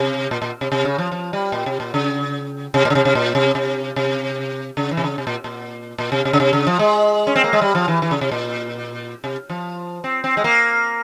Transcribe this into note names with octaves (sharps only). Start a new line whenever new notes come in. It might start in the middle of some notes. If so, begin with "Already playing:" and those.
Already playing: C3
A#2
A#2
C3
C3
C#3
F3
F3
G3
A#2
C3
A#2
C#3
C3
A#2
C#3
C3
C3
A#2
C3
C3
C3
C#3
E3
C3
C#3
C3
A#2
A#2
A#2
C3
C3
C#3
C3
C#3
F3
G#3
C#4
C4
A#3
G#3
G3
F3
E3
E3
C#3
C3
A#2
C3
F3
C4
C4
G#3
A#3